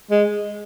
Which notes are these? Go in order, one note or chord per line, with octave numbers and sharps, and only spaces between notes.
G#3